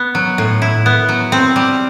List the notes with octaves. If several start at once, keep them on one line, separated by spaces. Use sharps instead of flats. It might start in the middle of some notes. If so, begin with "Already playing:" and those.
Already playing: B3
F#3
A2
E4
B3
F#3
C4
G3